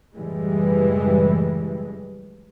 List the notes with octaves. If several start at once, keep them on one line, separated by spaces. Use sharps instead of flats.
F#2 A2 C#3 E3 G3 G#3